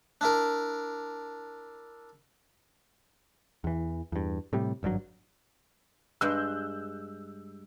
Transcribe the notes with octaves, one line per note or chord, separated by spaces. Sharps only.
D4 E4 A#4
E2 E3
E2 G2
A2 C3 G3
G#1 G2 D#3 F#3
G2 G#3 E6 F#6 G6